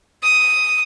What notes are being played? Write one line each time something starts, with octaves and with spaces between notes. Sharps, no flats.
D#6